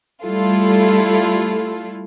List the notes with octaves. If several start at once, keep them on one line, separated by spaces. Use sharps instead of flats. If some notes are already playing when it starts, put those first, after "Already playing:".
G3 A3 E4 F4 A4